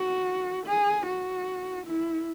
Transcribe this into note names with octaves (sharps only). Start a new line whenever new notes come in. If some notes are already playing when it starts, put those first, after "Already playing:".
Already playing: F#4
G#4
F#4
E4